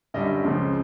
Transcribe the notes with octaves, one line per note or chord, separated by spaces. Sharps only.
F#2 D3 G3 D#5
C#2 C#3 F3 G#3 C4